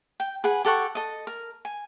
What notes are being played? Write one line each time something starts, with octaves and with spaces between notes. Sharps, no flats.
G5
G#4 B4 F#5 G#5
G4 A4 F#5 C#6
A4 D#5
A#4
G#5